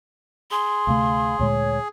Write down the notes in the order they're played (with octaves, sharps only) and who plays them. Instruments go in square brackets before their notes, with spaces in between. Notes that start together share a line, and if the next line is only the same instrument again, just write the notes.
[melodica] G#4 [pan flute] C6
[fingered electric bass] D2 C3 A3 [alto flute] F5
[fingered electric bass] D2 A#2 G#3 [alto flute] C#5